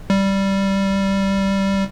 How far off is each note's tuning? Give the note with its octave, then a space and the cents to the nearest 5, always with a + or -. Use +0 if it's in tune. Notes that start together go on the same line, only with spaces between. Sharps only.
G3 -5